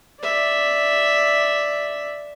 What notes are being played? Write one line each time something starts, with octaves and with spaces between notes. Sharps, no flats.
D5 E5